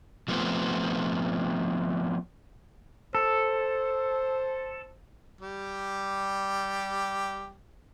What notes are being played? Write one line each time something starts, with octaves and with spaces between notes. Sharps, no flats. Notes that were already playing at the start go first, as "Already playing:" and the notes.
F3 A3 B3 C4
A4 C5
G3 G4